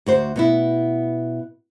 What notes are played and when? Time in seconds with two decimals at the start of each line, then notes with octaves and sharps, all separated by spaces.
0.06 D2 F#4 C5
0.36 B2 B3 E4